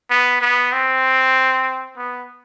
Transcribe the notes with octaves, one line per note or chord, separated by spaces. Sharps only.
B3
B3
C4
B3